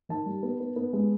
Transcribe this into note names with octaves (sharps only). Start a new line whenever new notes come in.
D#3 A5
G3
B3
B3
B3
G#3